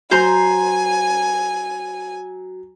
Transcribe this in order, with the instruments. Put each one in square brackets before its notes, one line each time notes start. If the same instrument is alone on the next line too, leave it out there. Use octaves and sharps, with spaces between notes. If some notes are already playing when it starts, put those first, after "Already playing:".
[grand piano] F#3 [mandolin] C5 A#5 C6 [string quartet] G#5